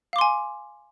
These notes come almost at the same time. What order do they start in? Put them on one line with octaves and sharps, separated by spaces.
F5 D6 C6 G#5